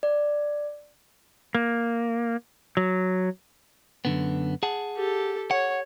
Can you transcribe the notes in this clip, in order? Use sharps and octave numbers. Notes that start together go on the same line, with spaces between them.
D5
A#3
F#3
F#2 D3 B3
G#4 F#5 A5
G4 A4
C#5 F#5